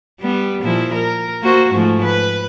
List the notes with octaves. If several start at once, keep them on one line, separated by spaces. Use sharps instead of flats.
G3 B3
A#2 F3 E4
A#4
A#3 F#4 C5
G#2 F3 A3
B4